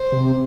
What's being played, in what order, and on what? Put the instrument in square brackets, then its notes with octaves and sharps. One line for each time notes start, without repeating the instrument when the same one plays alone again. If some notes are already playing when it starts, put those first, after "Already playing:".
Already playing: [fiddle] C5
[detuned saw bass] C3